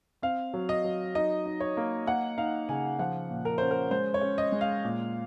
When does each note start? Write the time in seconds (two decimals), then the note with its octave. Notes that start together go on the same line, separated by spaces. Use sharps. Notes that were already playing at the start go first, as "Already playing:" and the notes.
0.22 C4 F5
0.54 F#3
0.69 D#5
0.84 F#3
1.15 D#4 D#5
1.46 D#4
1.60 C#5
1.77 A#3
2.07 A#3 F#5
2.38 D#4 F5
2.69 C#3 G#5
2.99 F3 F#5
3.30 A#2
3.45 A#4
3.58 C#4 C5
3.71 A#4
3.91 G#3 C5
4.14 C#5
4.21 C#4
4.38 D#5
4.52 G#3
4.61 F5
4.84 A#2